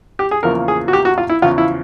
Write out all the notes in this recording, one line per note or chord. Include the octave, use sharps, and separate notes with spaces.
G4
G#4
E2 C#3 F3 A#3 A#4
G#4
F#4
G4
F#4
F4
E4
E2 C#3 F3 F4
E4